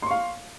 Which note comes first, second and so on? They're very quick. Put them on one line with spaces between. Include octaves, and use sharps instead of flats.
C6 C#6 F5